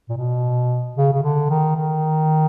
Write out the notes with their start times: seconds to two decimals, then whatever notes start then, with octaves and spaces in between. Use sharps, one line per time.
0.09 A#2
0.17 B2
0.97 C#3
1.13 C#3
1.23 D3
1.50 D#3
1.76 D#3